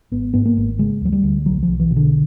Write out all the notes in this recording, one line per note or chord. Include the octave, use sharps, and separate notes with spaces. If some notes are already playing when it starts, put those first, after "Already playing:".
G#1 B3
G#2 B3
A#3
G#1
C#3 G#3
D2 F#3
G3
D2
B1 F#3
F3
B1
E3
B2
D3